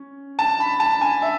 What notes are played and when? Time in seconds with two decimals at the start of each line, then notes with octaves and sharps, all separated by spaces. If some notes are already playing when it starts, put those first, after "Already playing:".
Already playing: C#4
0.39 A5
0.60 B5
0.80 A5
1.01 G#5
1.22 E5